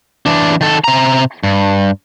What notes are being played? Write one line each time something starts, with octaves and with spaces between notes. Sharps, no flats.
E3 D4
D#3 A4
C3 A#5
G2